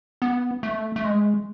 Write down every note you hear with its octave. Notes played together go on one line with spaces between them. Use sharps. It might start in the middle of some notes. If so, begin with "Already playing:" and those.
B3
A3
A3
G#3